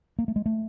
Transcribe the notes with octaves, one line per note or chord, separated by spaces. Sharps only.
A#3
A3
G#3
A3